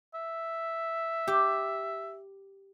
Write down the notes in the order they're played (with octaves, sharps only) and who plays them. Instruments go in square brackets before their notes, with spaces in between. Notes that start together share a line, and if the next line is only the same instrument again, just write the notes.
[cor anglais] E5
[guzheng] G4